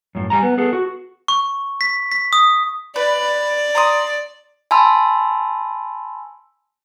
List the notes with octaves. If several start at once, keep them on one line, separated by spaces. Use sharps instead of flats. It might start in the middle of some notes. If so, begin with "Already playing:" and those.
F#2 A2
G3 G#5 A#5
B3
B3 G#4 A4
F#4
C#6
B6
B6
D#6
B4 D5
A#5 C6 D#6
G#5 A5 B5 C6 E6